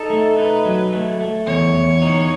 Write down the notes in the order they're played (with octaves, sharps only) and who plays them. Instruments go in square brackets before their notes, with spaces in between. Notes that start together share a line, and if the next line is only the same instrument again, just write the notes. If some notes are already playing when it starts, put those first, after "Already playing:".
Already playing: [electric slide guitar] D#4 [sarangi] A4
[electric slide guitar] A3
[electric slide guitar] D#4 [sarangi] B4
[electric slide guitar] F#3
A3
A3
[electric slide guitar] E2 [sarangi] C#5
[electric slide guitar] E2
D#4